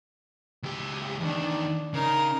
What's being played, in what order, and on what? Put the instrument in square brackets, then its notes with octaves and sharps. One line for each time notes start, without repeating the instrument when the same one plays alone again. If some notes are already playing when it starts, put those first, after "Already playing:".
[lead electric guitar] C#2 G4
[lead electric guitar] E2 D#3 [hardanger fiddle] D4
[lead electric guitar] C#3 [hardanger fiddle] D#4 A#4